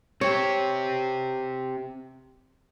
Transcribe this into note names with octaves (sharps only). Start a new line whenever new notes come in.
C4 G4 C#5